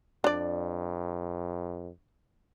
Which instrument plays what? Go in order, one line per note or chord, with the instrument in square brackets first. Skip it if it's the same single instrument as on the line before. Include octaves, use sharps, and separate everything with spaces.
[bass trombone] F2 [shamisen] D4 D5